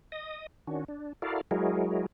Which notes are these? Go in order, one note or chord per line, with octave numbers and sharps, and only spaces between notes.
D#5 D#6
D#3 C#4 D4 F#4
D4
E4 F#4 A4 A#4 D5 F5
F#3 G#3 E4 F#4 G#4 A#4